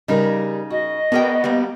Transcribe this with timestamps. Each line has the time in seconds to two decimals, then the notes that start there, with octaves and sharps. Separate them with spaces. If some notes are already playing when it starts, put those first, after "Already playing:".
0.08 C#3 G3 D#4 A#4 D5
0.70 F#4 D#5
1.12 B3 F#4 G#4 A#4 D5 G5 A5
1.44 G3 A#3